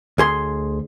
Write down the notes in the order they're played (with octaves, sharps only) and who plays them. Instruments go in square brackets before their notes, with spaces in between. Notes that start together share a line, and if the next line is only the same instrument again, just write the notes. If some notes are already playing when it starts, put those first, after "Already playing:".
[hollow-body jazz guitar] D2 G#4 C6